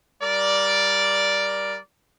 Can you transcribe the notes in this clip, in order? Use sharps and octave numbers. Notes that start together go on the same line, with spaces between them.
G3 A#4 D5